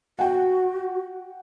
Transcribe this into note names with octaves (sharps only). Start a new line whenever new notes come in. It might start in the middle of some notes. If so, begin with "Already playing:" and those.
F#4 F#5 G5